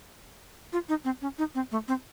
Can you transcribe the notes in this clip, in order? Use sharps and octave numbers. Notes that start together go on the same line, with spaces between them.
F4
D#4
C4
C#4
D#4
C4
A3
C4